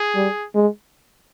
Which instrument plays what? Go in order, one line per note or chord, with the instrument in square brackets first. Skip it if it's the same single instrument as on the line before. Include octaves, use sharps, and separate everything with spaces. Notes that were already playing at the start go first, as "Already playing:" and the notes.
Already playing: [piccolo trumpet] G#4
[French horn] G3
G#3